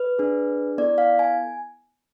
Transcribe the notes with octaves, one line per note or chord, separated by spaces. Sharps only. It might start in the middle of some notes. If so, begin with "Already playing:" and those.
Already playing: B4
D4 G#4
B3 E4 A4 D5
F5
G#5